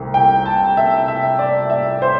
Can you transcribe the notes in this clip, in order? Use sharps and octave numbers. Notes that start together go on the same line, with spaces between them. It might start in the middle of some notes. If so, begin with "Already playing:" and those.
Already playing: C2 C3 A3
G5
A5
E5
E5
D5
E5
C5